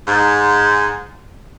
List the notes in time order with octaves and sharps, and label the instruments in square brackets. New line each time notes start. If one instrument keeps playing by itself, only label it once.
[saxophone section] G#2